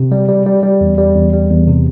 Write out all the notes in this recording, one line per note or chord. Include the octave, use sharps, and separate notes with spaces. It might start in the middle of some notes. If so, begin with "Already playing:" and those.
Already playing: C3
G3
G3
G3
G3
E2
G3
E2
G3
E2
C3